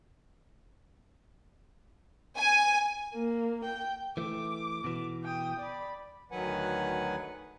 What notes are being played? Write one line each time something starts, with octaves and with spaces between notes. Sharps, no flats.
G#5
A#3
G5
E3 A3 D6
B2 E3
G5 D#6
D5 B5
D2 D#3 F#3 B4 F#5 G#5